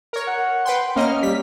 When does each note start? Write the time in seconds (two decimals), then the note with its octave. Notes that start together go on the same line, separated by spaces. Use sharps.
0.13 A#4 C#5
0.27 F#5
0.65 B4 G5 C6
0.96 A#3 C#4 D#5 F6
1.23 G3 B6